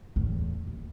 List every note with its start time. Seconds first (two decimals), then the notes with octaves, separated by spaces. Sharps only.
0.16 E2 A2
0.67 D#1